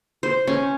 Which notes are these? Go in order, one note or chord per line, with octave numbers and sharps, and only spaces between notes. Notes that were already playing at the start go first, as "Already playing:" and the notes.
C5
C#4